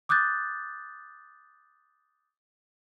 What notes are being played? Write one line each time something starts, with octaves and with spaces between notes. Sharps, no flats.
D6 D#6 F#6 G6 A6